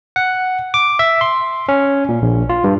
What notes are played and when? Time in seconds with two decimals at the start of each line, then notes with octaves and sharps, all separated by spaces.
0.16 F#5
0.74 D6
0.99 E5
1.21 C6
1.69 C#4
2.09 A#2
2.22 A#1
2.49 F4
2.64 G2